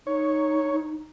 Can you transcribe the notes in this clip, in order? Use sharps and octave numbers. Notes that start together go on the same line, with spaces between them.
D#4 C#5